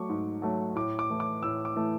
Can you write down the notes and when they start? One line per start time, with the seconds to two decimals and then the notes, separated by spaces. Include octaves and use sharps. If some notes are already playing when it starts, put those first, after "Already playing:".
Already playing: F#3 A3 C#6 D6
0.09 G#2
0.42 F#3 A3
0.76 A2 D6
0.99 D6
1.10 E3 A3
1.20 D6
1.43 A2 E6
1.65 D6
1.76 E3 A3